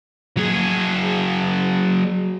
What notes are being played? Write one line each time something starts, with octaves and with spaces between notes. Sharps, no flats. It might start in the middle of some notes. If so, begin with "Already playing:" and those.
F#3 G#4